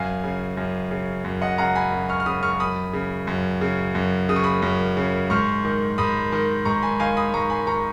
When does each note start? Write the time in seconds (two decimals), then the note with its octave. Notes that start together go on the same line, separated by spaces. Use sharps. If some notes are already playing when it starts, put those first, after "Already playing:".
Already playing: F#2 F5 G#5
0.24 C#3
0.57 F#2
0.91 C#3
1.25 F#2
1.42 D#5 F#5
1.58 C#3 F#5 A#5
1.75 G#5 B5
1.92 F#2
2.09 C#6 F6
2.20 F6
2.26 C#3 B5 D#6
2.43 C#6 F6
2.60 F#2 B5 D#6
2.93 C#3
3.27 F#2
3.61 C#3
3.95 F#2
4.29 C#3 D#6
4.36 C#6
4.43 B5 D#6
4.62 F#2
4.97 C#3
5.30 G#2 C#6 F6
5.65 D#3
5.98 G#2 B5 D#6
6.32 D#3
6.65 G#2 A#5 C#6
6.82 G#5 B5
6.99 D#3 F5 G#5
7.17 B5 D#6
7.34 G#2 A#5 C#6
7.50 G#5 B5
7.67 D#3 A#5 C#6